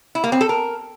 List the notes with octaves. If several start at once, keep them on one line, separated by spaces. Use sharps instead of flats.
E4
A#3
C4
A4
A#4